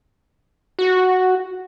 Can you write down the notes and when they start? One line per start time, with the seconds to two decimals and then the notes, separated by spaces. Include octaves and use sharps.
0.79 F#4